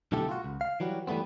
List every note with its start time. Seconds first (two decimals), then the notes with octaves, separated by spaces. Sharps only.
0.12 B1 D3 A3 E4 G4 A4
0.29 F4 F#4
0.44 C#2
0.61 F5
0.80 E3 F#3 G3 F#4
1.07 E3 G3 A3 B3 C4